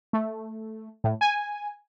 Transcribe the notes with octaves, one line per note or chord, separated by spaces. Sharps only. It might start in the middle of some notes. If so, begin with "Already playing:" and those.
A3
A2
G#5